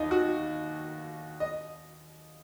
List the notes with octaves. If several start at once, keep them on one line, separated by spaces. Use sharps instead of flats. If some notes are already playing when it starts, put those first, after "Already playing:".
Already playing: D#2 D#4
F#4
D#5